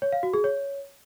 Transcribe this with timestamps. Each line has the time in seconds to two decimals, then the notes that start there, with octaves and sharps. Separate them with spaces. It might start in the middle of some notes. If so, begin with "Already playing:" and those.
0.02 C#5
0.12 F5
0.23 F#4
0.33 G#4
0.44 C#5